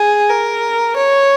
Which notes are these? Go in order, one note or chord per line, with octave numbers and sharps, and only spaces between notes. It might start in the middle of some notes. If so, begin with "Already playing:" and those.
Already playing: G#4
A#4
C#5